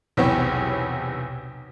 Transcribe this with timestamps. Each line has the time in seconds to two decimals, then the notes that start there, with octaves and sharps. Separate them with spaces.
0.17 B1 E2 C3 B3 C#5 G5